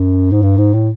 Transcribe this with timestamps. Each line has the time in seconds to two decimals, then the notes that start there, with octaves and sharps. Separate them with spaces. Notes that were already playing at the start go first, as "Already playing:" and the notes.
Already playing: F#2
0.32 G#2
0.42 G2
0.58 G#2
0.73 A2